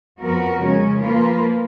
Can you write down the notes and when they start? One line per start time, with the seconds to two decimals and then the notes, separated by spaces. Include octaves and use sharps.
0.20 F2 F3 B3 F#4 A#4
0.61 C#3 G#3 C#4
1.01 F3 A#3 F4 B4